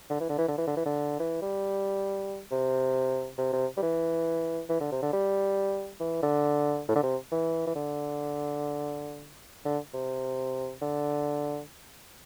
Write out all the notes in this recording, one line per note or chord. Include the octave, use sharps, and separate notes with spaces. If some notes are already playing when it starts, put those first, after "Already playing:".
D3
E3
D3
E3
D3
E3
D3
E3
D3
E3
G3
C3
C3
C3
G3
E3
E3
D3
C3
D3
G3
E3
D3
A2
D3
C3
E3
E3
D3
D3
C3
D3